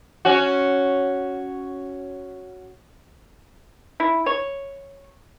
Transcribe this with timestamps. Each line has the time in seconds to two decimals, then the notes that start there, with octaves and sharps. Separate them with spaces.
0.25 C#4 F#4
4.00 E4
4.26 C#5